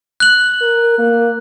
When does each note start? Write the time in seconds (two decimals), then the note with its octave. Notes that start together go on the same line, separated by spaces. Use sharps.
0.20 F#6 F#7
0.61 A#4
0.98 A#3